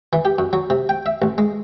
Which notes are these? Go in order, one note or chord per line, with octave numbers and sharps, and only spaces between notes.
E3
G4
F#2
F#3
C3
G5
E5
A1
G#3